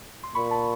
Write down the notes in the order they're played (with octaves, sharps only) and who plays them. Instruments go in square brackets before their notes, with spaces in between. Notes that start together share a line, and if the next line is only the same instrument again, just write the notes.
[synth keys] C6
[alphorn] A#2 [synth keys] B5 C#6
[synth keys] A5 B5